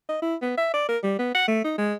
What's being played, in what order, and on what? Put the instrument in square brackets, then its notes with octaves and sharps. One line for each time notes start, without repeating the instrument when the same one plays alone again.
[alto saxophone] D#5
E4
B3
E5
D5
A#4
G3
B3
F#5
A3
D#4
G#3